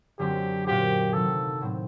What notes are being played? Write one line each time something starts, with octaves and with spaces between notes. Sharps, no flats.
F#2 D3 F#3 C4 G4
A#2 F#3 C4 F#4 G4 C5
C3 D#3 F#3 A4
A2 F#3 C4